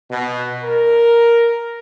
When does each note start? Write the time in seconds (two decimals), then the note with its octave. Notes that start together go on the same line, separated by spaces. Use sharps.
0.11 B2
0.63 A#4